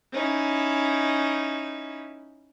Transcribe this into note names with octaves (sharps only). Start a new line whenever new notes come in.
C#4 D#4 E4